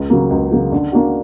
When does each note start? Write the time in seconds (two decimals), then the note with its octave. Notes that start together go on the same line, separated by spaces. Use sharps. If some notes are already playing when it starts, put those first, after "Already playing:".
Already playing: C#2
0.10 C#3 F#3 A#3
0.30 C#2
0.52 C#3 F#3 A#3
0.72 D3
0.92 A#3 D4 F#4